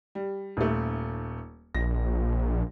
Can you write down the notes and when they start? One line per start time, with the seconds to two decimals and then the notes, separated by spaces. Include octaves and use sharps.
0.15 G3
0.57 D#1 A3
1.75 A#1 A#6